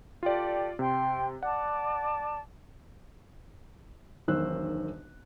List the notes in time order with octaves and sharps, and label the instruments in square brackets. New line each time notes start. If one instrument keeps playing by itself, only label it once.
[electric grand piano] F4 D5 [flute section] G4 A4
[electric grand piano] C3 [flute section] G5 C6
[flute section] D5 A5 [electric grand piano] F#5
[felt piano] E1 B1 D#3 C5 E6 F#6